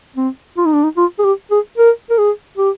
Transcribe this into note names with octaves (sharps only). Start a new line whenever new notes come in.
C4
F4
D#4
D4
D#4
F4
G#4
G4
G#4
A#4
A#4
G#4
G4